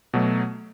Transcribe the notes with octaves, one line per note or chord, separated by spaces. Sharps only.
B2 F#3 A3